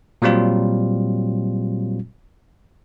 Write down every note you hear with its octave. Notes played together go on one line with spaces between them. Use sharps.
A#2 F#3 G3 C4 F4